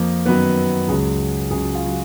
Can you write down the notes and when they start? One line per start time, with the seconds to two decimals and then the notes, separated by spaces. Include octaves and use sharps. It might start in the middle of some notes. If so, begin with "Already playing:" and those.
Already playing: F2 F3 A#3 A#4
0.26 F#2 D#3 F#3 B3 B4
0.88 C#2 C#3 F#3 G#3 G#4
1.51 C#2 C#3 F#3 G#4
1.63 F#4
1.74 F4
1.86 F#3 F#4